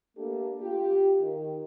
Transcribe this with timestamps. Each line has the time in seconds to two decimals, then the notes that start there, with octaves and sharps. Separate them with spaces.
0.17 A3 A#3 D4 G4 A4
0.61 F4 G4
1.21 D#3